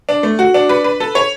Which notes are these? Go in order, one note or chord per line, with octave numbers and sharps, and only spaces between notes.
D4
A3
F#4
D4
B4
B4
A4
C#5